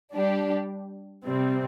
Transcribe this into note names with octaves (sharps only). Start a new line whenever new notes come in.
G3 D4 G4
C3 G3 C4